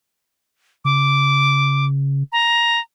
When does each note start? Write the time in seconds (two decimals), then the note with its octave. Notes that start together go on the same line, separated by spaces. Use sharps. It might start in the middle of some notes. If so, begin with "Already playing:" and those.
0.85 C#3 D6
2.32 A#5